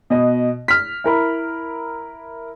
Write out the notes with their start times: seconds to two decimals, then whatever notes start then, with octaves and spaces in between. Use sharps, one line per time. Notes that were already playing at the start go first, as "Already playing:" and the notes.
0.10 B2 D#5
0.68 F6 B6
1.04 E4 A#4 B5